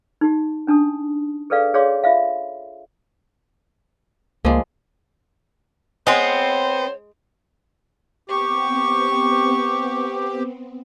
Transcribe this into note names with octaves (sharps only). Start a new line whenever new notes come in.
D#4 G4
C#4 D4 A5 D#6
G#4 A4 B4 D5 F5
G#4 C#5 D5 F5 C6 D6
F4 E5 F5
C#2 F3 G3 G#3 A#3
G#3 B3 C4 C5 C#5
B3 C4 G4 C#6